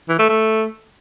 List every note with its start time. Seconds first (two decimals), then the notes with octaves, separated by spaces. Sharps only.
0.09 E3
0.19 A3
0.29 A3